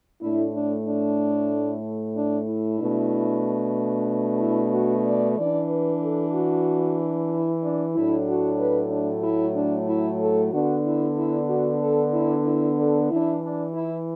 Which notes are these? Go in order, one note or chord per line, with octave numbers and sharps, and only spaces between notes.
A2 A3 D4 E4
D4
D4
D4
E4
B2 A3 D4
E4
F#4
D5
E3 D4 D5
B4
A4
F#4
E4
D4
A2 F#3 A3 D4 E4
F#4
B4
D4
E4
D4
E4
A4
D3 B3 D4 F#4
E4
E4
F#4
A4
E4
E4
A4
E3 D4 E4
D4
E4